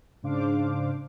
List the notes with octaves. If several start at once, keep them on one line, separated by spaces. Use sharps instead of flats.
G#2 C#3 D4 C5 F5 D6